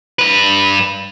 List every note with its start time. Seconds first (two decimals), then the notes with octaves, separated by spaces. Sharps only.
0.19 G2 B4